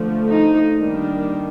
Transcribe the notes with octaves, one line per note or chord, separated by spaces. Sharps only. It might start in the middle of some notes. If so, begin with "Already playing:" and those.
Already playing: D3 F3 A3
D#4
D#3 G3 A#3 D4